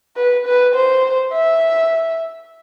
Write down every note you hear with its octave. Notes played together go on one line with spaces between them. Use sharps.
B4
B4
C5
E5